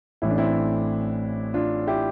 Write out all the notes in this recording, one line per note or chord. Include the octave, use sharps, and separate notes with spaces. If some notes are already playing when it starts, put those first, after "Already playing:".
A1 A2 E3 E4
D4
C4 E4
D4 F4
E4 G4